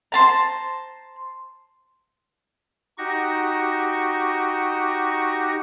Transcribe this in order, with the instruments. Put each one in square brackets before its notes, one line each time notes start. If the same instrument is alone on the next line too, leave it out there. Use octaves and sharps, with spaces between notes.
[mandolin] C5 A5 A#5
[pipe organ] D#4 F#4 G4 C#6 A#6